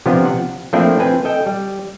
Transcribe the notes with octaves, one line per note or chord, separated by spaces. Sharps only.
C3 F3 B3 C4 D4
F#5
F3 A3 A#3 C4 D4 E4
C4 B4 G#5
A4 D#5 G5
G3